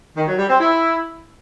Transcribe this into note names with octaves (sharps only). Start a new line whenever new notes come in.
D#3
F#3
G3
C4
E4